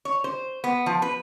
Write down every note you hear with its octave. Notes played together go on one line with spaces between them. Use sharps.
C#5
C5
B3
F3
B4